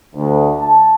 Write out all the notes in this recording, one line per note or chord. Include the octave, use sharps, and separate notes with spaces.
D2
A5